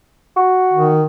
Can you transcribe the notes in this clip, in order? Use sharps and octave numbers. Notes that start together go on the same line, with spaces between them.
F#4
D#3